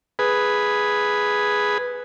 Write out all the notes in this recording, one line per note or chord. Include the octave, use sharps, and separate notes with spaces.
G#4 B4